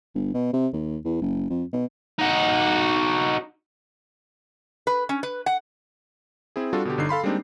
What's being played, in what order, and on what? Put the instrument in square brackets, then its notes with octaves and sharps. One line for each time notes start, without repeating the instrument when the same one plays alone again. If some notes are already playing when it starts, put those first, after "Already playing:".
[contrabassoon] G1
B2
C3
D#2
E2
F#1
F2
B2
[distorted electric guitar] D#4 F#4
[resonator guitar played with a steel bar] B4
C#4
B4
F#5
[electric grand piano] C4 E4 G#4
G3 D4 F4 F#4 A4
B2 D3 G4
G1 D3 D#4 C7
A4 F5 B5 C6
G3 G#3 A#3 C4 D4 D#4